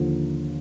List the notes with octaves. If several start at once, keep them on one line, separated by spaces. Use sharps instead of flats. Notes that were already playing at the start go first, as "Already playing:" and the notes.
Already playing: D#2 D3 F3